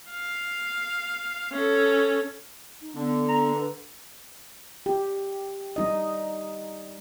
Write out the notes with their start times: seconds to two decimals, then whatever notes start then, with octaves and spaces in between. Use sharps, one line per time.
0.11 F5
1.52 C#4 A4
2.82 D#4
2.96 D3 B3
3.29 A#5
3.54 B4
4.86 G4
5.76 G3 D#4 D#5